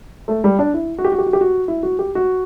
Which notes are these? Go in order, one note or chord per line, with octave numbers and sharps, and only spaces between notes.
A3
G3
D4
E4
F#4
G4
F#4
G4
F#4
G4
F#4
E4
F#4
G4
F#4